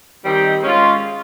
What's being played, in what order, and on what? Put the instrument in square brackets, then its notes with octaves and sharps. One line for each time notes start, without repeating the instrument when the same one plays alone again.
[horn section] D#3 G3 C4 D#4 G4
G#3 C#4 F4